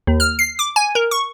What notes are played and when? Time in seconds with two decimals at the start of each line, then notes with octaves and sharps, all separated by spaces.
0.07 D#2
0.20 F6
0.39 C7
0.59 D6
0.76 G#5
0.95 A#4
1.11 C#6